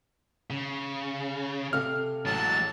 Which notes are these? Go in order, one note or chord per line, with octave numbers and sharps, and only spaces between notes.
C#3
C3 A4 F5 F6
A1 F#3 G#3 A5